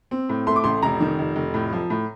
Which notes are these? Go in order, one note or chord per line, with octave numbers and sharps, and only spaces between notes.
C4
A2
A3 C6
D6
A1 C6
F1 A#5
D#3
F1
F1
A2
F3
A2